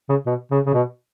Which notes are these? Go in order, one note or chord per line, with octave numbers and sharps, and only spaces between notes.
C#3
B2
C#3
C#3
B2